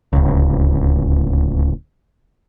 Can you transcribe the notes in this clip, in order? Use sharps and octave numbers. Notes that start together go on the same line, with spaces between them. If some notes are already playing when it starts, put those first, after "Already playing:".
D1 C#2